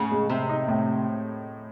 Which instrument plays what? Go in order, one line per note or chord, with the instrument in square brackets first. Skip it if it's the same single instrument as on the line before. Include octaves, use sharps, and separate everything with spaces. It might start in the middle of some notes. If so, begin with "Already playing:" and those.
Already playing: [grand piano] A2 [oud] C#3
[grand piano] G#3
[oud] C3 [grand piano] C4
[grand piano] D#4
A2